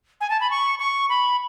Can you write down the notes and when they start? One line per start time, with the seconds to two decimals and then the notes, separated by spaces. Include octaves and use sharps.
0.21 G#5
0.30 A5
0.41 B5
0.51 C#6
0.79 C#6
1.09 B5